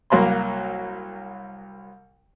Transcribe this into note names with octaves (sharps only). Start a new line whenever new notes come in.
C2 F#3 A#3 B5 C6